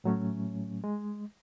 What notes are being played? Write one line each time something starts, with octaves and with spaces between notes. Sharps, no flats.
A2 F#3 A3 C#4
G#3